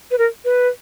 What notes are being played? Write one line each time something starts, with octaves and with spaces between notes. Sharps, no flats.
B4
A#4
B4